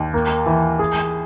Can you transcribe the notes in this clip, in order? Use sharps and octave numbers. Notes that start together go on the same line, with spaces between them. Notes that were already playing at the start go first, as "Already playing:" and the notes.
Already playing: D#2
A#3
E3
G#4